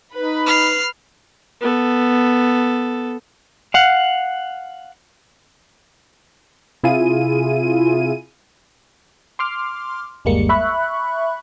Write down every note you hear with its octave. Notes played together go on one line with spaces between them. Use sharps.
D#4 B4 B5
F6 C7
B3 A4
F5 F#5
C3 E4 F4 G#4 D#7
C6 D6 F6
G1 D#2 G3 G#3 A#3 C#7
E5 B5 C#6 F#6